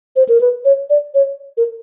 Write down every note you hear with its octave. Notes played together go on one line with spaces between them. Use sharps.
C5
A#4
B4
C#5
D5
C#5
A#4